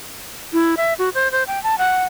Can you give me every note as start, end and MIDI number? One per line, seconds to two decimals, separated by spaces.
0.53 0.75 64
0.77 0.93 76
0.99 1.09 66
1.14 1.31 72
1.32 1.43 72
1.47 1.62 79
1.63 1.78 81
1.78 2.03 78